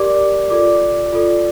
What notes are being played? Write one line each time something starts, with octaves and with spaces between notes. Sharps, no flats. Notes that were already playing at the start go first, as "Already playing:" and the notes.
Already playing: G4 A#4 D5 D6
F4 A4 D5 D6
F4 A4 D5